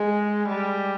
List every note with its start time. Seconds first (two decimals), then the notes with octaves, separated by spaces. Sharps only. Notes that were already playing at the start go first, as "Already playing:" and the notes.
Already playing: G#3
0.49 G3